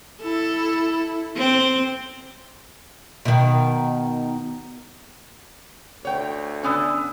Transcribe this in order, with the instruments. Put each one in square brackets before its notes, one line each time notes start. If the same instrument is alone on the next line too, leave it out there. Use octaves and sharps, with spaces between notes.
[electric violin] E4 [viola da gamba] A4
[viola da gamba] C4
[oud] B2 D#3
[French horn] D2 [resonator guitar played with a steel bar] C#5 G5
[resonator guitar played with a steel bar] D3 B3 C#4 [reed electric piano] G#5 D#6 E6